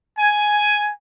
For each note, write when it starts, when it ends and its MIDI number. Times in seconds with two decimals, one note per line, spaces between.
0.19 0.92 80